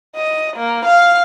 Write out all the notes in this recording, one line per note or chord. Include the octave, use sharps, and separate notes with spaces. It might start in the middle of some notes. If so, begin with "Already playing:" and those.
D#5
A#3
F5